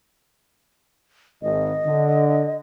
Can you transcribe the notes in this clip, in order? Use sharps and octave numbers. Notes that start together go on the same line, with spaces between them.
G#1 D#5
D3